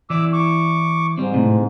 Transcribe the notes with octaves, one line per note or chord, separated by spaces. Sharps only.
E3 E4 D5 D6 E6
C#6 D6
G#2 G3 C4
A2 C3